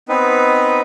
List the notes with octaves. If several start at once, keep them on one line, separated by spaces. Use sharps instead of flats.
B3 C4 D#4 B4